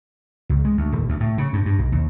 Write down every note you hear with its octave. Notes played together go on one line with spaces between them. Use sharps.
C#2
G#3
D2
D#1
D2
A2
C#3
G2
G2
B1
D#2